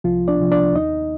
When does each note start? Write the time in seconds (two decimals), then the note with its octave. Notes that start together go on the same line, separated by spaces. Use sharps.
0.04 C2 F3 F4
0.28 D4 D5
0.39 C3 F3
0.51 D4 D5
0.75 D#2 D#4 D#5